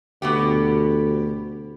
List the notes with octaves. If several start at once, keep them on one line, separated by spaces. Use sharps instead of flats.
D2 B2 B3 G4